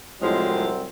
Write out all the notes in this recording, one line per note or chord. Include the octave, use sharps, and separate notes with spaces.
C2 A2 F3 F#3 G#3 C4